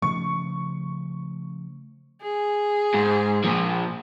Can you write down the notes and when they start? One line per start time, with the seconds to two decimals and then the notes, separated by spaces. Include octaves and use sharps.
0.02 C#3 F3 A3 C#6
2.22 G#4
2.94 G#2
3.44 A#2 F3